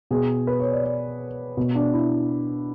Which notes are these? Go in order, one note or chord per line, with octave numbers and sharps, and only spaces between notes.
B2 G#4
B4
C#5
D5
D5
B2
D4
E4